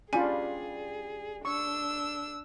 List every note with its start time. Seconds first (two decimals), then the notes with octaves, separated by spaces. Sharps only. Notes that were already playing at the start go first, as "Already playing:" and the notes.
0.13 G3 C#4 D4 F4 G#4 G#5
1.45 D4 C#6 E6